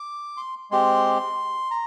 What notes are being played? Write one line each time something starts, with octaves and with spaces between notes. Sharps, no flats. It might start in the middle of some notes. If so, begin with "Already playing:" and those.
Already playing: D6
C6
G#3 C4 G4 C6
A#5